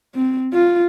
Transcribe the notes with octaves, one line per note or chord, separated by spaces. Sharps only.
C4
F4